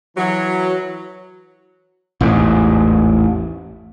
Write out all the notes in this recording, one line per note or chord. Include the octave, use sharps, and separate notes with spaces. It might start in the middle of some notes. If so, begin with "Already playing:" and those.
E3 F#3
A1 E2 G#2